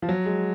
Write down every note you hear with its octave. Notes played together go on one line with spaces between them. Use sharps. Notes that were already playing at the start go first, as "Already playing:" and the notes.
F3
F#3
G#3